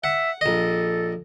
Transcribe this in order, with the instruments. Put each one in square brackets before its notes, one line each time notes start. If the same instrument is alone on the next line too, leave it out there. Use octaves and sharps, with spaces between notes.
[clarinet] E5 [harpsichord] F#5
[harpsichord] A#1 D#5 [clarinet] A4